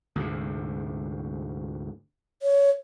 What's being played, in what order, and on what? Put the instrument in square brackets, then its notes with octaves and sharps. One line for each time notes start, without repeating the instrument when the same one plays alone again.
[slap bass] D2 G#2 C3
[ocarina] C#5